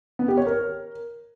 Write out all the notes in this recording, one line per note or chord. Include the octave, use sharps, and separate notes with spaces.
B3
G4
C#5
A#4